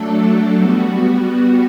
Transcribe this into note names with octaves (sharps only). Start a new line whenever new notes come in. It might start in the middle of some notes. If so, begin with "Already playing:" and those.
Already playing: F#3 A3 D4 A4
G3 B3 F#4